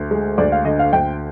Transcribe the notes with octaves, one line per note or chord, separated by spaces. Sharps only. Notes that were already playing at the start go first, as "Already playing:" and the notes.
Already playing: D2
G#3
D2 D5
F5
D3 D#5
F5
D2 G5